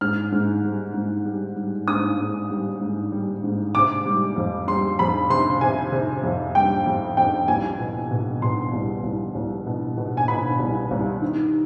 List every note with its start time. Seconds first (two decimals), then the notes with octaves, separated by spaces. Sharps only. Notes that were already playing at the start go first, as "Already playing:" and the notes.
0.01 G#2 F6
0.32 G#2
0.63 G3
0.94 G#2
1.25 G3
1.56 G3
1.88 G#2 D#6
2.18 G#2
2.50 G3
2.81 G#2
3.12 G3
3.44 G#2
3.75 C3 D6
4.06 G3
4.36 F2
4.67 G3 C6
4.99 F2 B5
5.30 C3 C6
5.61 C3 G#5
5.92 C3
6.24 F2
6.55 G3 G5
6.86 F2
7.17 F2 G5
7.48 C2 G#5
7.79 B2
8.11 B2
8.42 B2 C6
8.73 C2
9.03 C2
9.35 C2
9.67 B2
9.97 B2
10.17 G#5
10.28 B2 B5
10.59 C2
10.91 C2
11.22 D#3